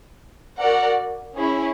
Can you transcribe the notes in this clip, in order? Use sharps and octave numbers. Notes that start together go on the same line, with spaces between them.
F#4 A#4 D5 F#5
C#4 E4 G#4 C#5